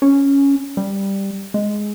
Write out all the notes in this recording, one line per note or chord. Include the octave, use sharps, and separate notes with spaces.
C#4
G3
G#3